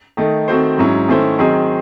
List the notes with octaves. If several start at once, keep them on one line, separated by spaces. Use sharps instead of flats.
D#3 A3 D#4
D#3 A3 C4 F#4 C5
G#2 F#3 C#4 E4
D#3 A3 C#4 E4 C5
D#3 F#3 C4 D#4 G#4